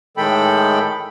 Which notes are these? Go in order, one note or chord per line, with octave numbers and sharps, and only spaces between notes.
A2 D#3 G#3 A4 G5 B5